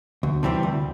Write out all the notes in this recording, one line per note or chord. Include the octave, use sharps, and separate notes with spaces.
D2
C3 E3 G3 C4
D2